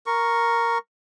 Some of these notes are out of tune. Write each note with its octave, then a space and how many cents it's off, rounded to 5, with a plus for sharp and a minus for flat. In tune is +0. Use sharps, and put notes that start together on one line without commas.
A#4 +0 C#6 +0